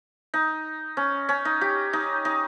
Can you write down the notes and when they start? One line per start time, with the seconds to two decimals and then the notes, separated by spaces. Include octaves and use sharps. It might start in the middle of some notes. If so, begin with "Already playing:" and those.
0.34 D#4
0.97 C#4
1.29 C#4
1.45 D#4
1.61 G4
1.93 D#4
2.25 D#4